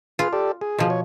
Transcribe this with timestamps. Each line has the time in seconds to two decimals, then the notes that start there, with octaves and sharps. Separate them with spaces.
0.19 F4 G#4 B4
0.33 G4 A4 D5
0.61 G#4
0.79 B2 F3
0.90 C#5